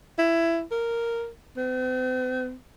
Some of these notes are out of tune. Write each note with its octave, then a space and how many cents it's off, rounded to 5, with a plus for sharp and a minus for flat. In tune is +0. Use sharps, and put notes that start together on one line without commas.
E4 +15
A#4 -5
C4 -45